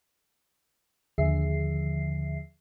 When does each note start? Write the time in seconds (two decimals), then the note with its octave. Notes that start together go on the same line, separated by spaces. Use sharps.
1.18 D#2 D3 F3 G#4 E5 C7